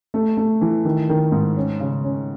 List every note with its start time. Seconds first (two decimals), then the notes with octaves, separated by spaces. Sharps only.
0.14 A3
0.37 A3
0.61 E3
0.85 D#3
1.09 D#3
1.32 G#2
1.57 C#4
1.80 C#3
2.04 C#4